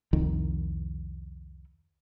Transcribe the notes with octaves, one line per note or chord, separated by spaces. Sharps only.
C2 F2 D#3